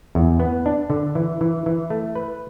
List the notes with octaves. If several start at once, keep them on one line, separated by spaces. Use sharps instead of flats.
E2
B3
D4
D3
E3
E3
E3
A3
B4